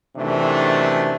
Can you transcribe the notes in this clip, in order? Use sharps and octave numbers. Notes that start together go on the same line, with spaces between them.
F#2 C3 D#3 E3 A3 D4